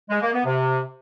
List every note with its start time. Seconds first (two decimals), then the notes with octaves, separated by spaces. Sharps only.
0.10 G#3
0.22 A#3
0.33 B3
0.45 C3